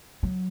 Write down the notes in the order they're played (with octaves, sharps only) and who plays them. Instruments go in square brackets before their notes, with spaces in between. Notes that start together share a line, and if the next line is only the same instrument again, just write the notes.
[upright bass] F#3